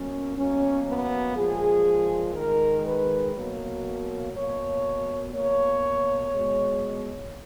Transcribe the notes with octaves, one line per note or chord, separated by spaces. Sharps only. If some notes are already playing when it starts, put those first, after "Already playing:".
Already playing: B2 F#3 A#3 C#4
B2 F#3 A#3 C#4
B3
A#2 F3 G#3 G#4
D#3 G#3 A#4
B4
B2 F#3 A#3
B2 A#3 C#5
B2 A#3 C#5
B2 G#3